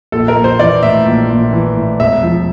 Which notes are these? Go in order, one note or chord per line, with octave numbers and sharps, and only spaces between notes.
A#1 A4
A#4
A#1
C5
E3 D5
A2 E5
A#1
A#1
E3
A2
E1 E5
F3